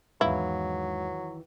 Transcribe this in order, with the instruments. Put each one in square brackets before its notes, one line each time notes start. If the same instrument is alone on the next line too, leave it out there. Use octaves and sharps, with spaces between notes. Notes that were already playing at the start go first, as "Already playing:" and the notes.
[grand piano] E2 G#2 [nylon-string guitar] D#3 E3 F5 [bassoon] F#3 [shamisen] E4